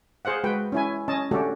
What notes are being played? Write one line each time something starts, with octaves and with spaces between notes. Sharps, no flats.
G#4 C5 F5 F#5
G#3 F#4 B4 G5
C#4 E4 G#5
C#4 D#5 A5
A3 C#4 D4 F#4 G4 A4